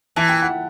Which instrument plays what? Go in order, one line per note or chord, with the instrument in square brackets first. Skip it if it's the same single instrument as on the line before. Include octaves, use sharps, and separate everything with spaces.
[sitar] E3 [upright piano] A5
[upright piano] G5
F#5